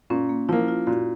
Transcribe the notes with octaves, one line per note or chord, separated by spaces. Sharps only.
A#2 C#4
A#3
F3 A#3 E4
F4
A#2 F#4